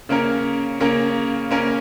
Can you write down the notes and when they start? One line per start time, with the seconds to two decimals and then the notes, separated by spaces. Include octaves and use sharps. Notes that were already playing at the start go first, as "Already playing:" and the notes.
0.09 C#3 A#3 C#4 A#4
0.80 C#3 A#3 C#4 A#4
1.51 C#3 A#3 C#4 A#4